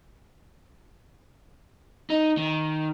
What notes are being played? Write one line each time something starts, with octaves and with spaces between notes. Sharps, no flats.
D#4
D#3